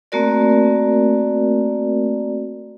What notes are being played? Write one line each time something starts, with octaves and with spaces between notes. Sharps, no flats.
A3 A#3 C4 F#4 A#4 D5